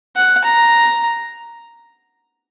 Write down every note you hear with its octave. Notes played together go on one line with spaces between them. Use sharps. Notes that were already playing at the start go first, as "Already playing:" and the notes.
F#5
A#5